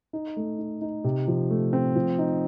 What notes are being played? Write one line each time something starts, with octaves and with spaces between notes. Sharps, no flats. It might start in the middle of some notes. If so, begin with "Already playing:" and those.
D#4
A3
D#4
D#4
C3
F3
A3
C4
F3
D#4